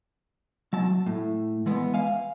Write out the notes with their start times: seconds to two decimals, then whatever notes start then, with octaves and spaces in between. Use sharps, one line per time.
0.73 F#3 A5
1.06 A2
1.66 E3 G#3 B3
1.94 F5 G#5